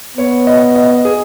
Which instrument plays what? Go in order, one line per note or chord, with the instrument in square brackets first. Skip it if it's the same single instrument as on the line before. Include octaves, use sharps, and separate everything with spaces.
[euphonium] B3 [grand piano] C#5
[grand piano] D#5
D#5
G#4